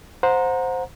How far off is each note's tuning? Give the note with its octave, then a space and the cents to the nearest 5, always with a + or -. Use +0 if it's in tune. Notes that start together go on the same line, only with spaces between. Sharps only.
C5 +0 F#5 -30 A#5 +0